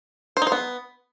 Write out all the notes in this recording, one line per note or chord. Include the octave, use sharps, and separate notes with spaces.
C5
D#4
C5
B3